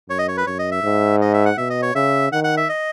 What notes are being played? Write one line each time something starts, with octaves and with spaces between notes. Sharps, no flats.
F#2 C#5
D#5
C#5
B4
F#2 C#5
D#5
E5
G#2
D#5
E5
F#5
B2 E5
D#5
C#5
C#3 E5
D#3 F#5
F#5
E5
D#5